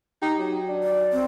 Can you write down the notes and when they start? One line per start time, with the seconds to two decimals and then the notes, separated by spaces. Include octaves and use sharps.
0.22 D#4 G4
0.39 F#3
0.69 D4
0.84 D5
1.12 C4